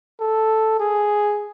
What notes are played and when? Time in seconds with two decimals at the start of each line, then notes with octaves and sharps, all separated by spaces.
0.20 A4
0.80 G#4